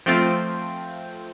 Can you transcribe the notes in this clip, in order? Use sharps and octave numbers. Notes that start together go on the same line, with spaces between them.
F3 A3 C4 F4 G5